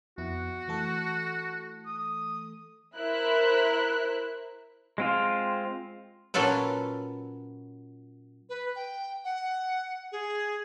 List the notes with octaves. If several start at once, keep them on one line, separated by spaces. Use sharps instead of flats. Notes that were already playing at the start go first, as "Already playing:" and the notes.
F2 B3 E4 F#4
E3 A3 A4
D#6
E4 A#4 C5 E5 F#6
G#3 C4 F4
A#2 F#3 C#4 F4 A4 B4
B4
G5
F#5
G#4